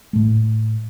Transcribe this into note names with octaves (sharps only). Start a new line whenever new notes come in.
A2 A3